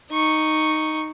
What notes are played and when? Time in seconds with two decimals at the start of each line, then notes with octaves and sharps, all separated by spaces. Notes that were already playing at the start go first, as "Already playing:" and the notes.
0.12 D#4 C#6